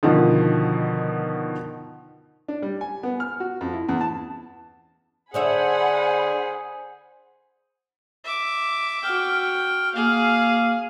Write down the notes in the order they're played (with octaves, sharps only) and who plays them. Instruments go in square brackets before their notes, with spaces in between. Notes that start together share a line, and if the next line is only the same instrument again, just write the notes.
[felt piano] B2 D3 D#3 F3
[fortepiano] D4
G3
G#5
B3
F6
F#4
F2
E4
E2
A5
[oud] D3 C#5 E5 [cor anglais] G#4 [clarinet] C5 [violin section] F#5 G#5 B5
[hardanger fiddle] E5 D6
[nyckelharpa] F#4 G5 [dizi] F6
[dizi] F6
[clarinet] A#3 [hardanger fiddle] G#4 [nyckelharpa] F5